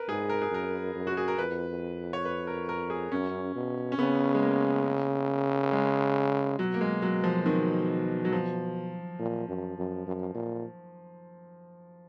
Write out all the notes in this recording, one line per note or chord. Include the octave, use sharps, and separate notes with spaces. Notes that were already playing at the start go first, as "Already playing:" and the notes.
Already playing: A#4 B4
G#2 G#4
A#4
G#4
F#2 A#4
F#2
F#4
G#4
A#4
F2 B4
C#5
B4
A#4
A#4
G#4
F#2 C#4
B2
C#4
C#3 B3
G#3
A#3
G#3
B2 F#3
A#3
G#3
F#3
F3
D#3
F#3
F3
A#2
F#2
F#2
F#2
A#2